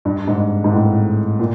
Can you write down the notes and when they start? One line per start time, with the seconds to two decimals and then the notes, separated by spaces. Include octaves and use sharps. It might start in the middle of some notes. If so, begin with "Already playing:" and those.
0.05 G2
0.28 G#2
0.64 G#2
0.72 A2
1.39 A#2